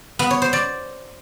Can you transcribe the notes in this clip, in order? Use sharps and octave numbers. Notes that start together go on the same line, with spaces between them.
B3
C#5
C5
D5